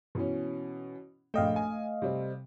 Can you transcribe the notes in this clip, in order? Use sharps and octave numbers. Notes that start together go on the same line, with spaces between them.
B2 E3 C#4
A#1 A3 D#5 F5 G5
G#5
C3 G3 C4